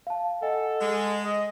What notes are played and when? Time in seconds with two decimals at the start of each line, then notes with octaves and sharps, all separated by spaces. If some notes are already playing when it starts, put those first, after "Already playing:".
0.07 F5 A5
0.42 A4 D#5 F#5 G#5
0.80 G#3
1.24 D#5